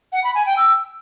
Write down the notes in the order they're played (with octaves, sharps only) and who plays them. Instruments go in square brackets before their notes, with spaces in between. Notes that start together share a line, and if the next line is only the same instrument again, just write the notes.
[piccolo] F#5
B5
G#5
G5
E6